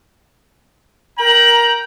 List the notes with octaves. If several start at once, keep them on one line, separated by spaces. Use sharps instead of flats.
A#4 G5 A#5 F#7